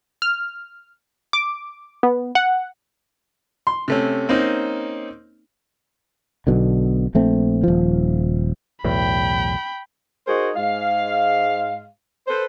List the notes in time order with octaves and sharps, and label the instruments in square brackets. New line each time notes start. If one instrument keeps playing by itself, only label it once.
[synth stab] F6
D6
B3
F#5
[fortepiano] C6
C3 A3 C#4
A#3 C4 C#4 D#4
[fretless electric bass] B1 B2 D3
A#1 A3 C4
D#1 F3
[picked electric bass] B1 E2 A2 [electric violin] G5 B5
[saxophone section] D#4 F#4 G#4 A#4 C5
G#2 G#3 F5
A4 B4 C5